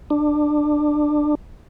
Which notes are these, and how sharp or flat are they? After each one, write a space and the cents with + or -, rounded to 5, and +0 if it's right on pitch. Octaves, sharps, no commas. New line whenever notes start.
D4 +20